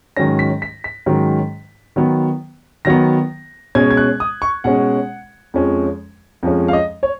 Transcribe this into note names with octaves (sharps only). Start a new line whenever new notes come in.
G#2 D#3 F#3 C#4 A#6
B6
B6
B6
G#2 D#3 F#3 C#4
D#3 F#3 B3
D#3 F#3 B3 A#6
B2 G#3 C#4 G#6
G#6
F#6
D#6
C#6
B2 G#3 C#4 F#5
F2 F3 G#3 C#4
F2 F3 G#3 C#4
F5
D#5
C#5